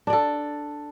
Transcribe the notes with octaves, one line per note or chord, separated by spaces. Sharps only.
D4 A4 D5